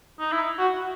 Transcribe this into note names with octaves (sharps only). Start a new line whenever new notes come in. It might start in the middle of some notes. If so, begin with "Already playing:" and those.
D#4
E4
F#4